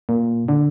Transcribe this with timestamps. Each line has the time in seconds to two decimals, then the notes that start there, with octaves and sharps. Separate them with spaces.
0.09 A#2
0.48 D3